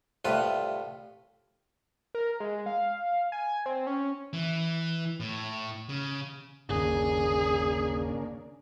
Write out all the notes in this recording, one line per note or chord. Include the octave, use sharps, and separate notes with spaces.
C2 A2 F4 B4
A#4
G#3
F5
G#5
C4
C#4
E3
A2
C#3
G1 D#2 C#3 A#3 D4 G#4